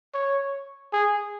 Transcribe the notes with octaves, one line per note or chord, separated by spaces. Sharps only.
C#5
G#4